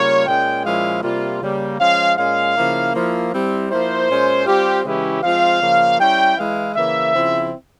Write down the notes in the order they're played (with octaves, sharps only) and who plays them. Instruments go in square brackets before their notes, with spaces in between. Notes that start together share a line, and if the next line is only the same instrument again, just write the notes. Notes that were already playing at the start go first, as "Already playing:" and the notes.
Already playing: [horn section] C#3 G3 A#3 F4 C#5
A#2 G#3 C#4 G5
A#2 F3 G#3 C#4 E4 F5
C3 G3 A#3 F4
C#3 G3 A#3
F3 G#3 C#4 F5
A#2 G#3 C#4 F5
C#3 F3 A#3 E4
F3 A#3 E4
G3 C4 E4
F3 A#3 E4 C5
A#2 G#3 C#4
G3 C4 F4 G4
C#3 E3 G#3 C#4 E4 G4
F3 G#3 C4 F4 F5
C#3 F3 A#3
G3 C#4 E4 G5
E3 G#3 E4 F5
C#3 E3 A#3 E5
C#3 F3 C4 E4